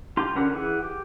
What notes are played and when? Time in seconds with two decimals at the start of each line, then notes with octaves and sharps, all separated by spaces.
0.17 F4 G4 A#5 C6
0.35 D3 C#4 A#4 F#5 B5
0.54 E3 G#4 F#5
0.83 G4